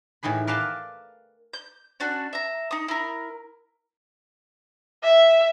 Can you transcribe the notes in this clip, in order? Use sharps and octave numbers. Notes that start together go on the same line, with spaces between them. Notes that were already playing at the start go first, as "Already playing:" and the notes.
A2 D#3 E3 G#4 B5
A#4 B4 D5 F5 G5 A5
G6
C#4 D4 F#4
E5 A#5
D#4 D#6
E4 A#4
E5